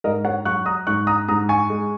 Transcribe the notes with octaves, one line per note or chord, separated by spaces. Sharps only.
G#2 A#4 D#5
C#5 F#5
F#3 C#6 F#6
A#5 D#6
G#2 C#6 F#6
A#5 D#6
G#2 A#5 D#6
G#5 C#6
G#3